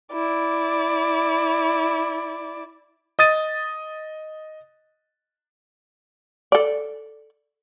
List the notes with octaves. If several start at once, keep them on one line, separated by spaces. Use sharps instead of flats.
E4 D5
D#5 D#6 A6 D#7
A4 D5